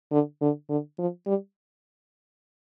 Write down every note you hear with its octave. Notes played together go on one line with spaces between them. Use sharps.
D3
D3
D3
F3
G3